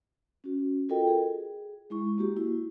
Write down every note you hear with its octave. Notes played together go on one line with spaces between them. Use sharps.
C#4 F#4
F4 F#4 A4 A#4 D#5 G5
G#4
G#3 E4 C#6
A#3 F#4 G4
E4